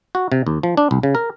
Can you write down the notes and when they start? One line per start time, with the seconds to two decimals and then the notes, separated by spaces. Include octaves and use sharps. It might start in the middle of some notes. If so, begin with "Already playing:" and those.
0.15 F#4
0.32 C3
0.47 D#2
0.63 F3
0.77 D4
0.91 C2
1.03 C#3
1.15 A#4